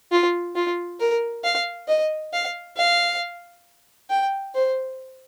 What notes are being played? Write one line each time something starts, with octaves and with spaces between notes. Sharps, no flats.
F4
F4
A#4
F5
D#5
F5
F5
G5
C5